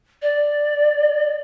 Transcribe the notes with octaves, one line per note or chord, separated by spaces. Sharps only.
D5